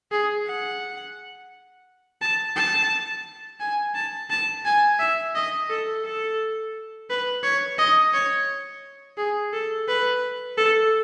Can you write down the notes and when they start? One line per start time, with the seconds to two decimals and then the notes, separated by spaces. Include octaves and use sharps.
0.11 G#4
0.47 F#5
2.21 A5
2.56 A5
3.60 G#5
3.95 A5
4.30 A5
4.65 G#5
4.99 E5
5.35 D#5
5.69 A4
6.04 A4
7.09 B4
7.43 C#5
7.78 D#5
8.13 C#5
9.17 G#4
9.53 A4
9.88 B4
10.57 A4